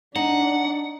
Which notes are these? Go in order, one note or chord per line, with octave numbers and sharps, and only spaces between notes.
D4 D#4 F#5